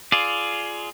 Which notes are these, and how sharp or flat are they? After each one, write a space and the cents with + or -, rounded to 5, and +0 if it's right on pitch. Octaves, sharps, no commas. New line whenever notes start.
F4 -5 G#4 +20 D5 +0